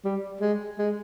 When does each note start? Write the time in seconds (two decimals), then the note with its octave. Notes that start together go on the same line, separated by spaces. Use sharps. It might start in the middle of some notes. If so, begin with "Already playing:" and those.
0.05 G3
0.41 G#3
0.79 G#3